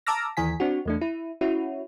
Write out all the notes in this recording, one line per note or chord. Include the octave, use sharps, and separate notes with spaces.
A5 A#5 D6 E6 F6 A#6
D#2 E3 G#5 B6
C4 D4 F#4
E2 A3 D4
E4
C#4 E4 F#4